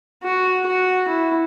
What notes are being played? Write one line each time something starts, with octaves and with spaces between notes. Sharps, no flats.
F#4
F#4
E4